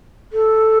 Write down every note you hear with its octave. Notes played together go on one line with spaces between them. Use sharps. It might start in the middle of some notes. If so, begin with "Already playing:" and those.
A4